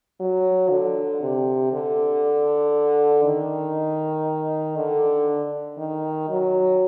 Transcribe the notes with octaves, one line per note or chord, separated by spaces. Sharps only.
F#3
D3
C3
D3
D#3
D3
D#3
F#3